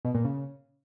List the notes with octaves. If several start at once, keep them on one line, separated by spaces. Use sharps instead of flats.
B2
A#2
C#3